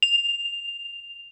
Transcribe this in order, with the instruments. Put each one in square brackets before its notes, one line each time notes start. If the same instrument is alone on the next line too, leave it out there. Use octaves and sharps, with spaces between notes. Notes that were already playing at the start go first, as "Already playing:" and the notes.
[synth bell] F7